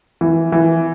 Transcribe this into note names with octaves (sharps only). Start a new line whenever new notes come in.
E3
E3